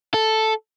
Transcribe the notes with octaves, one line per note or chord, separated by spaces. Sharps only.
A4